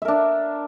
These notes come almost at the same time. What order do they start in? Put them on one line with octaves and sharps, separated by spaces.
E5 A#4 D4